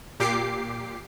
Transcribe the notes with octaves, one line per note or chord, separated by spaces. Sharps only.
A#2 G4 D6 C7